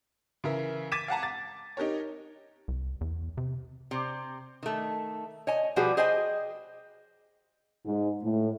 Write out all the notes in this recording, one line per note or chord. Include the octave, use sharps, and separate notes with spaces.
C#3 E3 A#4 E5
D6 G#6 A6 B6 D#7 E7
F5 F#5 A5 A#5
A6
D#4 G4 A#4 C#5
C2
E2
C3
C3 C4
D#3 A3
C#5 D#5 G#5
B2 F3 G3 F#4 G#4 B4
G#4 C5 D#5 G5 G#5
G#2
A2